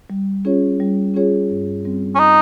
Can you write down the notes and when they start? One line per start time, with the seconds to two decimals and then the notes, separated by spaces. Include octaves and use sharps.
0.10 G3
0.45 C#4 F4 G#4 C#5
0.80 G3
1.14 C#4 F4 G#4 C#5
1.50 G2
1.85 G3 C4
2.15 C#4
2.19 D#4